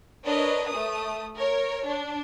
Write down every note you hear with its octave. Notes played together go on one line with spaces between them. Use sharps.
D4 A#4 B4 C#5 D#5
A3 D#6
A#4 C#5
D4